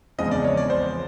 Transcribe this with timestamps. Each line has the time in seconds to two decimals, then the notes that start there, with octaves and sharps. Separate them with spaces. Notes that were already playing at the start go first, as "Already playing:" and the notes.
0.18 E2 C#3 F3 G#3 C4 D#5
0.31 D5
0.44 C#5
0.57 D5
0.70 C5